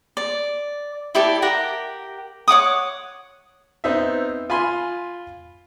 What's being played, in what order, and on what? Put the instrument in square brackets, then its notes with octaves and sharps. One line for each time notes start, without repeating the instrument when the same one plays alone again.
[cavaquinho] D5
E4 G4 A4 D5
G4 A#4 F#5
C#5 F#5 D6 D#6
[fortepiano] B3 C4 D#4 E5
F4 G#5 B5 C6